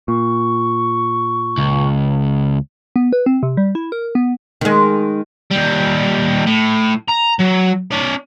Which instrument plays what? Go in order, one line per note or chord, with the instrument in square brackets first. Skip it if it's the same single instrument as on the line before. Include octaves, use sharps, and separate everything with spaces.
[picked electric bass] A#2 [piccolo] C#6
[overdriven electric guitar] C#2
[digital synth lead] B3
B4
C4
C3
G3
E4
A#4
B3
[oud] D#3 G#3
[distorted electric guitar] D#2 G3
A2
A#5
F#3
C#4 D5